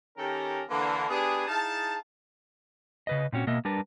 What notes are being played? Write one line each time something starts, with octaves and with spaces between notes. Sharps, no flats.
D#3 C#4 G4 A4 A#4
D3 E3 A#3
B3 D4 G4 G#4
D#4 E4 G#4 F5 A5
C#3 B4 D#5
A#2 C4 C#4 F#4
B2 A#3 D#5 E5
G3 D4 A#4 B4 A5